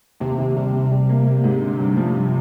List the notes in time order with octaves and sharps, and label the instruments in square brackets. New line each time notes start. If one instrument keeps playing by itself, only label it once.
[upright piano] D#2 [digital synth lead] C3
[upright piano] D#2
[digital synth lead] C3 [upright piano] G3
[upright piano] C4
G3
A#3
A#3
G#2
D3
G2
F3
G2